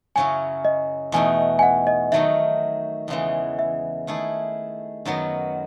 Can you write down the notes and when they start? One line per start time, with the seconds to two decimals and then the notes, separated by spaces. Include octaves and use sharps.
0.16 F#2 C#3 F#3 C#4 E4 G#5
0.65 D#5
1.12 E2 B2 A3 D#4 G#5
1.59 G#5
1.63 F#5
1.87 D#5
2.12 D#3 F#3 A3 D#4 E5
3.08 E2 C#3 E3 G#3
3.59 E5
4.07 D#3 A3 E4 G#4
5.05 F#2 D#3 F#3 B3